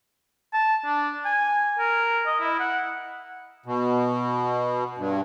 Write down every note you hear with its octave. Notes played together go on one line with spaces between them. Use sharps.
A5
D4
G#5
A#4
D#5
E4
F#5
B2
G2